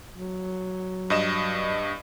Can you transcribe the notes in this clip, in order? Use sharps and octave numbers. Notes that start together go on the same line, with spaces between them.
F#3
G2 D#5 E7